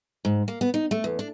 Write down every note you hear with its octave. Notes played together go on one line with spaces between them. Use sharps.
G#2
A#3
B3
D#4
A3
E2
D4